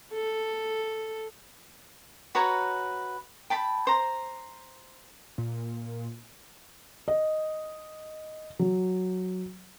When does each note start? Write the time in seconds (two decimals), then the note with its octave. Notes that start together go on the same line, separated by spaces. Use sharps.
0.13 A4
2.35 F#4 B4 C#5 A#5
3.50 G5 A5 B5
3.87 C5 A#5
5.38 A#2
7.08 D#5
8.59 F#3